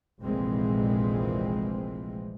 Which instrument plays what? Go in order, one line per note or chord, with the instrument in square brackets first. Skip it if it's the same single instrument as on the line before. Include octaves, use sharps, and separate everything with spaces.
[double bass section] F1 A#1 A#2 E3 G#3 C4